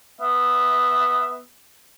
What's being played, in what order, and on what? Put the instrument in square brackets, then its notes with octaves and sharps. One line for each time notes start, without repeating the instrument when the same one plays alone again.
[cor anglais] B3 [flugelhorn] E5